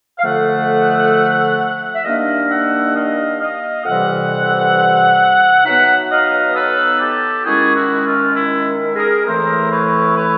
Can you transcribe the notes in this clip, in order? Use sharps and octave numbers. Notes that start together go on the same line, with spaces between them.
F5
F2 D3 F3 A3 E5 F#5
E5
D#3 G3 A#3 D4 D#5 F5
E5 F#5
D#5 F5
D#5 F5
F2 C3 E3 G3 C4 E5 F#5
B2 F#3 B3 D#4 E5 F#5
D#5 F5
A4 B4
G4 A4
D#3 G#3 C#4 E4 F#4 G#4
E4 F#4
F4
E4
G#4 A#4
A2 E3 A3 C4 E4 A#4 C5
B4 C#5
B4 C#5